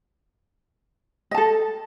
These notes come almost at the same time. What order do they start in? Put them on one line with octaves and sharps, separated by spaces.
D#5 A5 A4